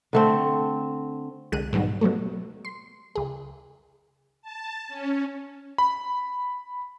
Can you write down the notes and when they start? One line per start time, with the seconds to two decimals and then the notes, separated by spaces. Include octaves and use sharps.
0.13 D3 A3 C4
1.52 C2 D3 G#3 F#6 D#7
1.73 G#2 B2 D#3 F#3 G3
2.01 B2 F#3 G3 A3
2.65 C6
3.15 C#2 G#4
4.42 A5
4.88 C#4
5.78 B5